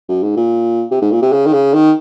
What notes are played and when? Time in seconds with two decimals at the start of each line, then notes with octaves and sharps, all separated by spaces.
0.09 F#2
0.22 G#2
0.36 A#2
0.91 C3
1.02 G#2
1.12 A#2
1.22 C3
1.32 C#3
1.46 D#3
1.53 C#3
1.73 D#3